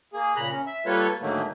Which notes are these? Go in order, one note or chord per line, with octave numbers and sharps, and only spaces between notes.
A#3 G#4
A#2 C#3 A#5 B5 F#6
C#4
E5
G3 A#3 F4 A4 B4 C#5
G#2 D3 D#3 F#3 A3 A#3